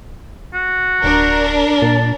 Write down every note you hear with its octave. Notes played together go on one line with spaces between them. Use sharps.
F#4
D1 D4 A#4
A#2 A5